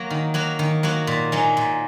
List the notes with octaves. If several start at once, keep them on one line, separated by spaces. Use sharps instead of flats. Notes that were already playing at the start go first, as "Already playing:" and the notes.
Already playing: F#3 A#3 F#4
D#3
F#3 A#3 F#4
D#3
F#3 A#3 F#4
A#2
F#3 A#3 D#4 G#4
A#2